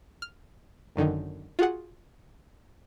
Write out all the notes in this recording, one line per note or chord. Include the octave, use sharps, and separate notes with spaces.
F6
G#1 F#2 D3 D#3
F4 F#4 G#4 F#5